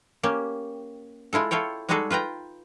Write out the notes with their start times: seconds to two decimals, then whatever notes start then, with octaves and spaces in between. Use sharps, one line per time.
0.23 A#3 C#4 G4
1.33 G#3 E4 F4 A4
1.51 E4 F4 A4 C#5 G5
1.89 G3 G#3 D#4 F#4 G#4 A4
2.10 F4 B4 G5 A#5